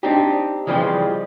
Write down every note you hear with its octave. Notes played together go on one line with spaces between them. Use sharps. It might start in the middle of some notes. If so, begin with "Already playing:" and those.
C4 D4 D#4 G4
C#3 E3 F3 G3 G#3 C4